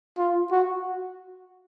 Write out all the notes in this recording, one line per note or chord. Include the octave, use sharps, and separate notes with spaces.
F4
F#4